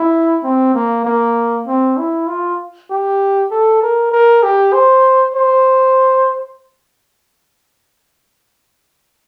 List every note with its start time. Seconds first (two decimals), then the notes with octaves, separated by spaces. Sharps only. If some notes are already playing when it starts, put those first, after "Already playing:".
Already playing: E4
0.43 C4
0.75 A#3
1.05 A#3
1.67 C4
1.97 E4
2.27 F4
2.90 G4
3.51 A4
3.82 A#4
4.12 A#4
4.43 G4
4.73 C5
5.34 C5